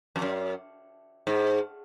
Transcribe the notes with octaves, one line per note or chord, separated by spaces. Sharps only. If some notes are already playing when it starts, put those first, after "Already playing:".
F2
F#2
G#2